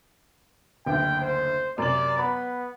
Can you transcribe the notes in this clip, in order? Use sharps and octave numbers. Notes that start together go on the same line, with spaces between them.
F#1 D2 G5
C5
F#2 C3 D5 F#7
B3 B5